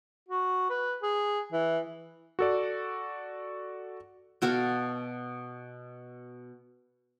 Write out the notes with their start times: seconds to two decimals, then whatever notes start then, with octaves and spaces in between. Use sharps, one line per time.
0.29 F#4
0.69 B4
1.02 G#4
1.52 E3
2.39 F#4 A4 D5
4.42 B2 F#4 A4 F5